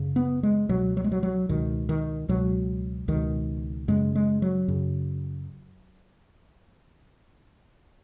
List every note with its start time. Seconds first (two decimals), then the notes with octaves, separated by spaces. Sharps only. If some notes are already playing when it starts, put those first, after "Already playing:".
Already playing: F#2 C#3
0.16 B3
0.43 G#3
0.69 C#2 B2 F#3
0.97 F#3
1.04 G#3
1.12 F#3
1.23 F#3
1.49 C#2 B2 D#3
1.89 D#3
2.29 C#2 B2 F#3
3.08 C#2 B2 D#3
3.88 F#2 C#3 G#3
4.15 G#3
4.42 F#3
4.68 F#2 C#3